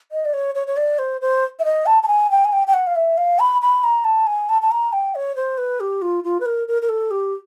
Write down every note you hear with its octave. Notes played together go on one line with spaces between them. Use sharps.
D#5
D5
C#5
C#5
C#5
D5
C5
C5
E5
D#5
A5
A5
G#5
G5
G#5
G5
G5
F#5
F5
E5
F5
B5
B5
A#5
A5
G#5
A5
A5
A#5
G5
C#5
C5
B4
G4
F4
F4
B4
A#4
A#4
A#4
A4
G4